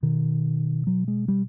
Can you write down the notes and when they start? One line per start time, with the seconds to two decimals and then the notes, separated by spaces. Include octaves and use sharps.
0.03 B2 D#3
0.87 F#3
1.08 G#3
1.28 G3